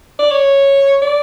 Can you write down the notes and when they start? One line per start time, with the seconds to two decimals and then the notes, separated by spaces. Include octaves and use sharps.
0.19 D5
0.31 C#5
1.02 D5